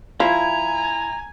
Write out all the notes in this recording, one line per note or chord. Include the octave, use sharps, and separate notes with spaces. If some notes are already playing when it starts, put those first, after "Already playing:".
F3 E4 G#5 A#5